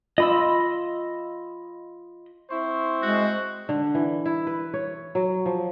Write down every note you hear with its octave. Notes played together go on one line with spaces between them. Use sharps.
F4 D#5 B5 E6
C4 E4 C5 C6 C#6
G#3 F#4
D3
E3
E4
B4
C#5
F#3
F3